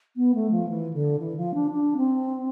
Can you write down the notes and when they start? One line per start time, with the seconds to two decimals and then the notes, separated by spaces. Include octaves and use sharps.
0.16 B3
0.34 A3
0.51 F3
0.68 E3
0.93 D3
1.19 E3
1.36 F3
1.54 D4
1.71 D4
1.97 C4